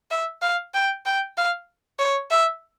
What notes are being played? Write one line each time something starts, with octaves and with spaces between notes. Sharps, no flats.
E5
F5
G5
G5
F5
C#5
E5